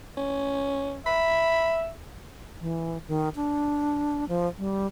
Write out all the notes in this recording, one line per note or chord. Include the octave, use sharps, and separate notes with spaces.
C#4
E5 B5
E3
D#3
D4
F3
G3